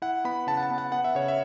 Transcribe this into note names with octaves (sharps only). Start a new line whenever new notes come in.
E4 F#5
B3 B5
C#3 A5
F#5
A5
B3
F#5
B3 F#5
E5
C#3 C#5
E5